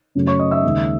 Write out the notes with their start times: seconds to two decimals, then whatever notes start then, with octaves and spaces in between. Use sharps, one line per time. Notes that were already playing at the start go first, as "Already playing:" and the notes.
0.15 F#2 C#3 F#3 A3
0.27 C#5 C#6
0.39 D#5 D#6
0.51 E5 E6
0.63 D#2 C#3 G#3